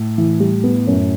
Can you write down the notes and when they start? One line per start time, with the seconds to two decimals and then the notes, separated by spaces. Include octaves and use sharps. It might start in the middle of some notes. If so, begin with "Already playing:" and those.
Already playing: A2
0.18 E3
0.40 G3
0.64 B3
0.87 F#2